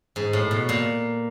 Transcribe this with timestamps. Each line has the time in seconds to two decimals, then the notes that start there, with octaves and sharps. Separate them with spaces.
0.16 G#2
0.33 A2
0.51 B2
0.69 A#2